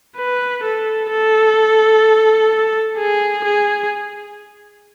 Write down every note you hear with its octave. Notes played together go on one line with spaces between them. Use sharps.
B4
A4
A4
G#4
G#4